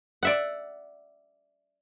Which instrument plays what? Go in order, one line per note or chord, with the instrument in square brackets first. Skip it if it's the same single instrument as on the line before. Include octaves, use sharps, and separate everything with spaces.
[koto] D5 E5 F#5